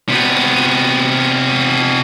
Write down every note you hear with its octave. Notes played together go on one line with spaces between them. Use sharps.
C3 B3